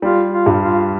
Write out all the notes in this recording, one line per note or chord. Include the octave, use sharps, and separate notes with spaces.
G3 F4
F4
G2
F4